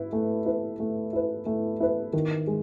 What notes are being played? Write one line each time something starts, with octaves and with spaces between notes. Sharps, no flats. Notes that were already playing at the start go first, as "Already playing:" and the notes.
Already playing: E4 B4
A3
E4 B4
A3
E4 B4
A3
E4 B4
D#3
G#3